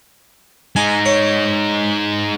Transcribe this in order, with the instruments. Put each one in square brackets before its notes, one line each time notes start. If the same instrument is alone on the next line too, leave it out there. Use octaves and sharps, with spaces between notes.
[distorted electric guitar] G#3 D#4 [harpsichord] G#5
[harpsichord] C#5